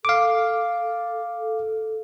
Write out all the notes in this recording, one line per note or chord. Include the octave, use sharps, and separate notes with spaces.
A4 F5 D6